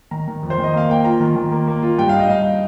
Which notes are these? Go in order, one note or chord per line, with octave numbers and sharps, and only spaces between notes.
D#3 A#5
D#3
F2
C5
D#3
D#5
A#3 F5
A#3 G5
F4 A#5
D#3
D#3
A#3
A#3
F4
G2 G5
D#4 F5
D#5
G2 F5